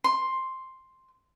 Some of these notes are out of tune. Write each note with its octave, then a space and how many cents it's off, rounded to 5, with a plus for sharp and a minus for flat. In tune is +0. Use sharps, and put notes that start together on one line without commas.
C6 +5